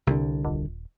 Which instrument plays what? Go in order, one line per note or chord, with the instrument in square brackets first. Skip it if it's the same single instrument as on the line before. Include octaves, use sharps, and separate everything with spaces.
[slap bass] C2 D3
[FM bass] D#1